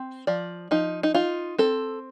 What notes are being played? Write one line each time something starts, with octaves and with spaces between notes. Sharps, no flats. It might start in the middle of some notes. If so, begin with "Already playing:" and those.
Already playing: C4
F3 D5
F3 D#4
D#4
D#4 F4
C4 A4